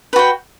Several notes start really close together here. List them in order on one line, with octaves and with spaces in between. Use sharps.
B4 F#4 G5